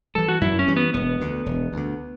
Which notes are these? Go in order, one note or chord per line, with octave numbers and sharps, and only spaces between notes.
E3 G3 A4
F#4
F#2 E4
C#4
E3 G3
B3
E1 B3
D2 D3
E1
D2 D3